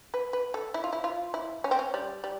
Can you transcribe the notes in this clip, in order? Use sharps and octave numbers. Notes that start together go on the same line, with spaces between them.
B4
B4
A4
E4
F4
E4
F4
E4
C#4
C4
C#4
G3
G3